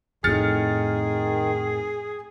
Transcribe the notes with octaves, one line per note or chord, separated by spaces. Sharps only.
F2 A2 D#3 G#4 F6 A6 C#7